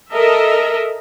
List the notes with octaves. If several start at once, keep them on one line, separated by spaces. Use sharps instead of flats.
A4 A#4 D#5 E5